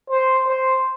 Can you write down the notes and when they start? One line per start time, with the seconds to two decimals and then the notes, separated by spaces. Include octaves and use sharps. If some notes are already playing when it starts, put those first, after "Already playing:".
0.10 C5
0.48 C5